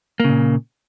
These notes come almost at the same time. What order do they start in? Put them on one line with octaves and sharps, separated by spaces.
A#3 C#3 A#2